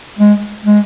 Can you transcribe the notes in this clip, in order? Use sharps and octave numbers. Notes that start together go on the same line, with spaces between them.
G#3
G#3